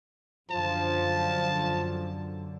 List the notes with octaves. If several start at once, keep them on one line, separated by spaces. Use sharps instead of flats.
F#2 D3 F3 A5